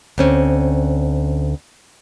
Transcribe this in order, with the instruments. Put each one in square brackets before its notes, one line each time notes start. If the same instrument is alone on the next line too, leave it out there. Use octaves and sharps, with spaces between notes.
[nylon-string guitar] D2 C4 C#4